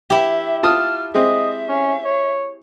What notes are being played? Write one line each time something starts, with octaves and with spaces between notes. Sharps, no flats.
E4 G4 E5
F4 A5 D#6 F6
G#3 C4 D#5 E5
C#4
C#5